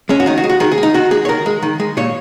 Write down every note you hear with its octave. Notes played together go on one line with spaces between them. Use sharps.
G#3 C#4
F#4
D#3 D#4
F#4
G#3
F#4
D#3 G#4
G#4
G#3
D#4
D#3 F#4
G#3 G#4
C#5
D#3 A#4
G#3
D#3
G#3
A#2 C#5